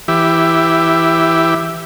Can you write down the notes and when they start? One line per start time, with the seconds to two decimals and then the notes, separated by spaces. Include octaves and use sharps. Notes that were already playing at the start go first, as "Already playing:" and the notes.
0.08 E3 G4 E5